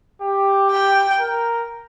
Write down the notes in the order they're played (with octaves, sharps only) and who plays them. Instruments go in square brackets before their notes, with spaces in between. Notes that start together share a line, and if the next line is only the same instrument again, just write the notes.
[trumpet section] G4
[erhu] G5
[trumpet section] A#4